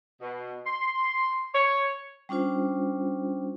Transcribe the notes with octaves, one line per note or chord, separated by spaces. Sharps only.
B2
C6
C#5
G3 C#4 D4 F4 C5